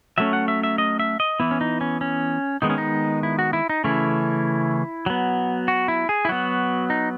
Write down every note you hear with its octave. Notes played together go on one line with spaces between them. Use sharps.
F#3 A3 C#4 E5
F#5
E5
E5
D#5
E5
D#5
E3 B3 E4
C#4
D#4
C#4
C#4
D#3 G#3 B3 D#4
C#4
D#4
E4
F#4
E4
D#4
C#3 E3 A3 C#4 E4
F#3 B3
F#4
E4
G#4
E4
F#3 B3 F#4
D#4